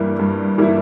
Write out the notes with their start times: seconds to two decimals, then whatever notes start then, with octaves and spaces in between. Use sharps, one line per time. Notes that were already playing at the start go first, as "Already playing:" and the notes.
Already playing: G2 E3 G3 A#3 E4
0.19 G2
0.58 E3 G3 A#3 E4